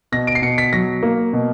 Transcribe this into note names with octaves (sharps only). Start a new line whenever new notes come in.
B2 A#6
D7
C7
B2 C#7
B6
F#3 A#6
A#3
B2